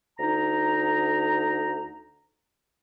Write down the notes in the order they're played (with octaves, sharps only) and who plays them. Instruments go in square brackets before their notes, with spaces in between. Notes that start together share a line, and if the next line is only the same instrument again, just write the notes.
[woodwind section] D2 D#4 A#5